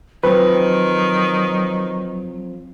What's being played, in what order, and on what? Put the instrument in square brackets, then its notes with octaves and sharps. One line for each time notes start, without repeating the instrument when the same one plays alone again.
[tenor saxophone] D#3 [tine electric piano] F3 C4 [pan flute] F#3 [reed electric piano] B4